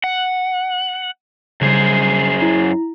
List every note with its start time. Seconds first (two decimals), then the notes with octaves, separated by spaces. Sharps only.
0.04 F#5
1.61 F#2 C#3 G3 G#4 C5
2.40 E4 A#5